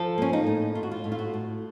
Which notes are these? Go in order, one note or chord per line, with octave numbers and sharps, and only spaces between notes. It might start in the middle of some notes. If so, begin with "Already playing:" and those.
Already playing: F3 A4
A#3 C#4
D#4
A2
A3 F4
F#4
F4
A2
F4
F#4
A2